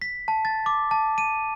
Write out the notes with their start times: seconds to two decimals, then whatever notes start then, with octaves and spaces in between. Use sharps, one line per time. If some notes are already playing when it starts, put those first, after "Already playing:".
0.02 B6
0.28 A5
0.45 A6
0.66 D6
0.91 A5
1.18 D#7